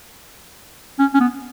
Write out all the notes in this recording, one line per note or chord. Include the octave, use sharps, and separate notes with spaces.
C#4
C#4
B3